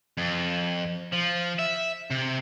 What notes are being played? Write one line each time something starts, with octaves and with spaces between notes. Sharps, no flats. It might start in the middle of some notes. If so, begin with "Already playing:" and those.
F2
F3
E5
C3